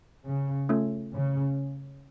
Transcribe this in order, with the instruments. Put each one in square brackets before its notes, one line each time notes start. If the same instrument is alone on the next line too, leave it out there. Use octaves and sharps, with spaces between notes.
[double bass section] C#3
[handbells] A3 C#4 F4 A4 C#5
[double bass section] C#3